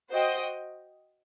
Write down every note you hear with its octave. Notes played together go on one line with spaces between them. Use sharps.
F#4 C5 D#5 G5